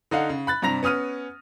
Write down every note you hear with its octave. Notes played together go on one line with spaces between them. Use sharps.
D3 D#4 F5 F#5
C#3
B5 F#6 A6
G2 C3 A#5 A#6 F7
B3 C#4 D#6 F6 D#7